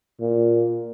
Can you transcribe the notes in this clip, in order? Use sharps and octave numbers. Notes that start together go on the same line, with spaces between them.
A#2